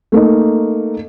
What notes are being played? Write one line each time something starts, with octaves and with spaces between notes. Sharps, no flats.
A3 A#3 D#4